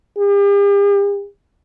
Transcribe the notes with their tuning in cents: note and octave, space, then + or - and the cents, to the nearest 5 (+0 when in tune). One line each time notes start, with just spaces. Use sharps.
G4 +45